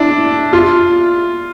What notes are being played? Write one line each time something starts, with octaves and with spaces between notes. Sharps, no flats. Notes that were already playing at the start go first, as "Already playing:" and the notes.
Already playing: D4 E4
F4